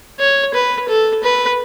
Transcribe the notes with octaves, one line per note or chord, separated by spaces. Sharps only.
C#5
B4
A4
B4